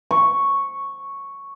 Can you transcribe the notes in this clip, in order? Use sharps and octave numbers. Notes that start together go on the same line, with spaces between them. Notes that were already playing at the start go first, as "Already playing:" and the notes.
C#6